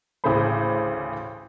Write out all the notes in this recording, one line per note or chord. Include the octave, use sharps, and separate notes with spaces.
A1 D2 C#3 G#4 C5 B5